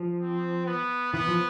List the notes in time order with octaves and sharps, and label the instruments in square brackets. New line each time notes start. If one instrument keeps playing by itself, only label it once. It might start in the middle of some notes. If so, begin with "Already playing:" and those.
Already playing: [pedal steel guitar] F3
[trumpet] C4
B3
[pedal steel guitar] E3 [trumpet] B3
[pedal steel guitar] F3